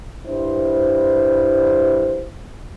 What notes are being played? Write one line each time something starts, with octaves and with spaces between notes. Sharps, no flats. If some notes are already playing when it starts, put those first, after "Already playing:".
G2 E4 C5